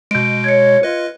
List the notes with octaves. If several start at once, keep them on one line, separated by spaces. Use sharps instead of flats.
B2 G#3 G6 D7
C#5 G#6 C#7
F4 B4 D#5